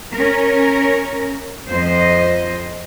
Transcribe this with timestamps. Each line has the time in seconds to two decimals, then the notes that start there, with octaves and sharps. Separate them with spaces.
0.14 C#4 A#4
1.69 F2 C5 D#5